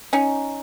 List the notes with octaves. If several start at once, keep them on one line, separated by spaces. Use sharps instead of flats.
C#4 D#4